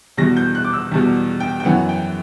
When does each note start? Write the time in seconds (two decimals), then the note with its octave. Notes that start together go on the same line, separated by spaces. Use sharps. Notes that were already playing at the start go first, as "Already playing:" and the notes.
0.17 E2 B2 G3 A#6
0.37 G6
0.55 F#6
0.64 D6
0.74 E6
0.92 E2 B2 G3
1.40 G5
1.60 G5
1.65 F#2 E3 B3 F#5
1.89 G5